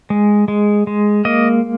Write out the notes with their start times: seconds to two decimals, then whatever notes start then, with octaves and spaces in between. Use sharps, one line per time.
0.10 G#3
0.48 G#3
0.87 G#3
1.25 A#3 D#5